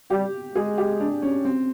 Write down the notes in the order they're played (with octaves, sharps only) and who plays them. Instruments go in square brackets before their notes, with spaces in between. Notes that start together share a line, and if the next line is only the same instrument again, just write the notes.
[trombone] G3 [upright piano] G4
[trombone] G#3 [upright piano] G#4
[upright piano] G4
D4
C#4
C4